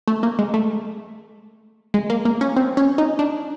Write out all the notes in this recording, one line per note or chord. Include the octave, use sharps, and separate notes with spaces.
A3
A#3
G#3
A3
G#3
A#3
A#3
C#4
C4
C#4
D#4
D4